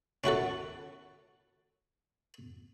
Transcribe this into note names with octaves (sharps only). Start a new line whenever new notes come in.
C#4 E4 F#4 A4